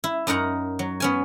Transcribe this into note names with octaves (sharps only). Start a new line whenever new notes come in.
E4
F#2 D#4 A#4 F#5 A#5
F#3
B3 C#4 G#5